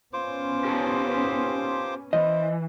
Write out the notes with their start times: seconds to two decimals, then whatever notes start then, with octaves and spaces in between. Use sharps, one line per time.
0.13 B3 C#4 F4 C5 D6
0.65 G4 A#4 A5
2.13 E3 C5 D#5